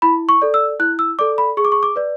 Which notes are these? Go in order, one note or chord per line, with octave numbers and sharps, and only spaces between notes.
E4 B5
C#6
A4 D5
E6
E4 F#6
E6
A4 D5 D6
B5
G#4 C#6
D6
C#6
D6
B4 D5